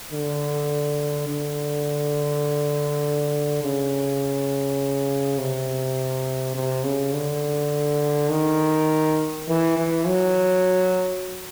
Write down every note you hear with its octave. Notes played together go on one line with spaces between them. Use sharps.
D3
D3
C#3
C3
C3
C#3
D3
D#3
E3
E3
F#3